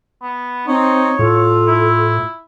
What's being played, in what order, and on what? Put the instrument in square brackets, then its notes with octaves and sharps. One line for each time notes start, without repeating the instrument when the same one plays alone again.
[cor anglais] B3
[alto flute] C4 [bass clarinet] D#4 [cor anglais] C#5
[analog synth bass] A2 [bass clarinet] F4 [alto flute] A4
[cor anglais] E4